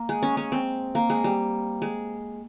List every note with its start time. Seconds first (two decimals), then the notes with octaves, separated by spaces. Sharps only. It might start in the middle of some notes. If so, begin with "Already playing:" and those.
Already playing: A#3
0.09 G#3
0.23 C#4
0.37 C#4
0.52 C4
0.95 A#3
1.10 G#3
1.24 G3
1.82 G#3